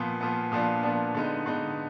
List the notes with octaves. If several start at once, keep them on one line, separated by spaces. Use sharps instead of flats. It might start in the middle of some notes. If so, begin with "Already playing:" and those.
Already playing: A#2 F3 B3
A#2 F3 B3
A#2 F3 B3 D4
A#2 F3 B3 D4
D3 G#3 B3 D#4
D3 G#3 B3 D#4